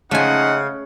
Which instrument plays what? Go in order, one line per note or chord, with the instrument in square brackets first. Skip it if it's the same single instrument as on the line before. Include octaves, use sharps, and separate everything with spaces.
[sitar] C#3 [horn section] F3 C#4 D#4 [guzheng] A3 G#5 [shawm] F#5